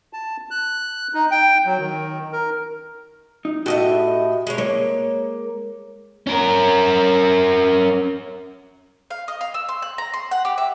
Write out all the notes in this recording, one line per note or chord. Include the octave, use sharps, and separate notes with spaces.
A5
F#6
D#4
G5
F#3
D#3
A#4
D#4
A2 F#4 G4 A4 D#5 E5
G#3 C#5
G#3 A#3 C#5
C#4 A#4
F5
D#5
F5
E6
C6
F#6
A#5
C6
F#5
G4
E5